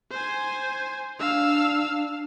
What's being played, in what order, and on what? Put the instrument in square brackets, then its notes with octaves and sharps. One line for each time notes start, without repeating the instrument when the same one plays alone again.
[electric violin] C5 G#5
[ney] D4 [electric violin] F5 E6